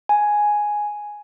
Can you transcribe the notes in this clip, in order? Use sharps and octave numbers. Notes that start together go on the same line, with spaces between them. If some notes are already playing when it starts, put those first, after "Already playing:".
G#5